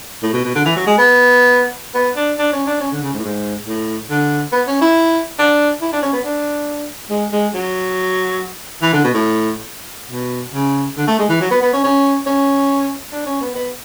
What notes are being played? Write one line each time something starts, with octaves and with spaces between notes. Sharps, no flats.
A2
B2
B2
D3
E3
F#3
G#3
B3
B3
D4
D4
C#4
D4
C#4
D3
C#3
G#2
A2
G#2
A2
D3
B3
C#4
E4
D4
E4
D4
C#4
B3
D4
G#3
G#3
F#3
E3
D3
B2
A2
B2
C#3
D3
A3
G#3
E3
F#3
B3
B3
C#4
C#4
C#4
D4
C#4
B3
B3